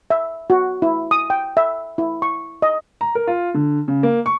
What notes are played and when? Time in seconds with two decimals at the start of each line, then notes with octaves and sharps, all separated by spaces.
0.10 E5
0.50 F#4
0.82 E4
1.11 D#6
1.30 G5
1.57 E5
1.98 E4
2.22 C#6
2.62 D#5
3.01 A#5
3.15 A#4
3.27 F4
3.54 D3
3.88 C#3
4.03 A#3
4.26 C#6